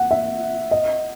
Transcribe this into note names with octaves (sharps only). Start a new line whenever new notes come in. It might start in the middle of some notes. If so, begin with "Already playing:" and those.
Already playing: F#5
E5
D#5